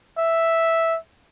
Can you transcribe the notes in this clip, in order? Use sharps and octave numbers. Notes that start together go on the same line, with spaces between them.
E5